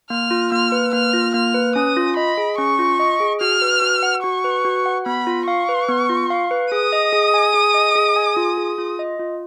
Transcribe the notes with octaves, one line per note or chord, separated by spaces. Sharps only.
A#3 F6
F4
A#3 F6
B4
A#3 F6
F4
A#3 F6
B4
C#4 D#6
F4
D#5 B5
G#4
C#4 C#6
F4
D#5
G#4
F#4 F6
B4
F#4
F#5
F#4 C#6
B4
F#4
F#5
B3 B5
F4
F5 C#6
B4
B3
F4
F5
B4
G#4 D#6
D#5
G#4
G#5
G#4
D#5
G#4
G#5
F4
G#4
F4
D#5
F4